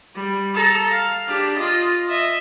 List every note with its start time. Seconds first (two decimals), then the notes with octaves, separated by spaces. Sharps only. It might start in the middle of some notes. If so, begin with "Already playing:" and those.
0.16 G3
0.54 A4 A#5
0.92 F5
1.28 D4 G4
1.58 F4 D#5
2.08 D#5 E5